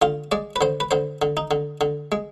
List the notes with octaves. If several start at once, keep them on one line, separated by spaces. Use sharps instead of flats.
D3 F4
G#3 D5
B4
D3 C5
B4
D3 C5
D3
D#4
D3
D3
G#3